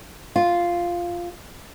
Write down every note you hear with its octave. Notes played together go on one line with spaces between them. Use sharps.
F4